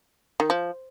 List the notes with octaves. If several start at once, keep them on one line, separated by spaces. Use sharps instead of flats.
D#3
F3